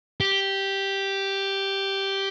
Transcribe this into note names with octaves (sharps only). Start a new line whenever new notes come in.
G4